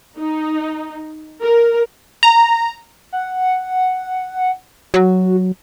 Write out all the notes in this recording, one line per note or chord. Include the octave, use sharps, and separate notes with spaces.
D#4
A#4
A#5
F#5
F#3 F#4